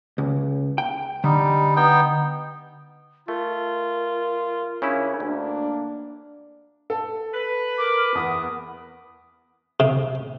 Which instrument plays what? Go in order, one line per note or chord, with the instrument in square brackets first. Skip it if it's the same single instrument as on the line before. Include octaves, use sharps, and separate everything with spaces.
[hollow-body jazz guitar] C#2
G5
[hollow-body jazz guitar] D3 [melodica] G3 D#4
[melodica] B3 D#4 G5
[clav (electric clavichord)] A3 [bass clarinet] F4 [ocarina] A#4
[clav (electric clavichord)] C#3 C#4 E4 [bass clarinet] D4
[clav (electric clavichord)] D2 [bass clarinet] A#3 [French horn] D4
[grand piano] A4
[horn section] B4
[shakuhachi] A#4 [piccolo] D6
[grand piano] E2 [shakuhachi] B3 [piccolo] D#6
[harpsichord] C3